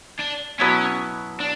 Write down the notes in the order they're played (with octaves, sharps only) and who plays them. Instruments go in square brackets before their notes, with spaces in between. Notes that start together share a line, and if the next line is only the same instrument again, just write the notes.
[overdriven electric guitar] D4
[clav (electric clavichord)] B2 F#3 B3 E4 [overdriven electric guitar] C#4
[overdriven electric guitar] D4